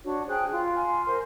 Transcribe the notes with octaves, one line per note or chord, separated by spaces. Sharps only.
D4 F#4 C#5
G#4 C5 G5 F#6
F4
G#5 C6 F6
A#4 C5 C6